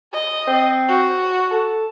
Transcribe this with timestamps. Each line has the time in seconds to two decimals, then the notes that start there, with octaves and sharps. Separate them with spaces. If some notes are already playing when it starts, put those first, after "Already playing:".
0.13 D#5
0.47 C4
0.89 F#4
1.51 A4